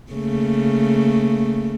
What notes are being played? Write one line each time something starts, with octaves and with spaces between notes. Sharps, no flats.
C#3 A3 A#3